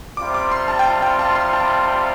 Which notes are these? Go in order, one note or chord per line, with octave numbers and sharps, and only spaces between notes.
C3 G3 F4 D6
D6
C6
A5
G5
A5
G5
A5
C6
A5